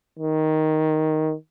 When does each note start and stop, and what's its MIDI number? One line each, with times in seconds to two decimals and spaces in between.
0.19 1.34 51